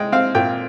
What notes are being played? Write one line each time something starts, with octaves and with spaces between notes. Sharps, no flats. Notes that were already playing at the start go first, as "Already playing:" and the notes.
Already playing: G#3 G5
C4 F5
A#2 G5